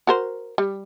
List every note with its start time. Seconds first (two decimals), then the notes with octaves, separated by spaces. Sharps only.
0.07 F#4 A#4 C5
0.58 G3